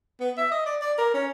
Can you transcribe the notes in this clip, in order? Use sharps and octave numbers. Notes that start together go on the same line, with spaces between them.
B3
E5
D#5
D5
D5
A#4
C#4